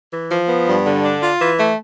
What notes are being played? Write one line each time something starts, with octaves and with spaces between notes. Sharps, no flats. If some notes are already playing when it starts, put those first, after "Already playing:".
E3
F3
B3
G2
D3
D4
F4
E3
A3